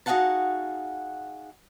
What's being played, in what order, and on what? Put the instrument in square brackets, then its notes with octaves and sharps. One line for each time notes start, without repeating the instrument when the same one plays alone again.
[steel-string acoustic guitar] D#4 F#4 G#4 F5 F#5 A5